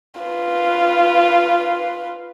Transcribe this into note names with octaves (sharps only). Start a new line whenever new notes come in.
F4 B4